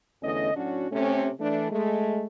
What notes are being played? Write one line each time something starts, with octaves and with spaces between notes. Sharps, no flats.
E2 D3 A3 C#4 D#5
A2 F#3 C#4 D4 F#4
C3 A3 C#4
E3 A3 D4
G#3 A3